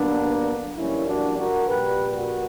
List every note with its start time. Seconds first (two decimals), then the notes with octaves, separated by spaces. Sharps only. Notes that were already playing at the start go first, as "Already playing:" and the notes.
Already playing: G2 D3 F#3 A#3 B3 D4
0.76 F#2 E3 G3 A#3 C#4 E4
1.06 D4 F#4
1.37 F#4 A#4
1.67 A#1 A#2 G3 G4 B4
2.12 F#4 A#4